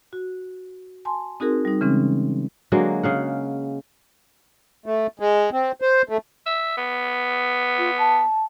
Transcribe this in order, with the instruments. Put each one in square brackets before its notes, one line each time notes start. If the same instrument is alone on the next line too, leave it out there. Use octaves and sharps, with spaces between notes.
[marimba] F#4
G#5 A5 C6
C4 D#4 F#4 G#4 A#4
G3 D#4
C#3 E3 G#3 C4 C#4
[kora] D3 F#3 G#3 A#3
C#3 F5 F#5
[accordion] A3
G#3
C4
C5
A3
[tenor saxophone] E5
B3
[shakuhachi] F4
A5